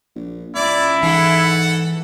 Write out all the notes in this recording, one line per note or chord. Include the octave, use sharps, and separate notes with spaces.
A#1
C#2 E4 D5
G#2 E3 A4 F#5